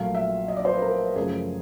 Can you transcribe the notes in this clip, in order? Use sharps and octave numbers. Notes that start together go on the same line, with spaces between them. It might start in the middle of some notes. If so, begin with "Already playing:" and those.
Already playing: A#1 A#2 F#3 A3 F5
E5
D#5
D5
C5
B4
A#4
F#2 C#3 F3 A3 G#4